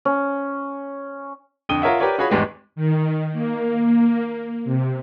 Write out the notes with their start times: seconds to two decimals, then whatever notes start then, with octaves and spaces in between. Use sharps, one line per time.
0.05 C#4
1.69 F2 D3 G5 D#6 D#7 G7
1.82 F4 A#4 C#5 E5 F#5
1.99 G4 A#4 B4 C#5 D5
2.18 F4 F#4 G#4 C#5 B5
2.30 G#1 E2 G#2 G#3 G4 B4
2.76 D#3
3.33 A#3
4.65 C3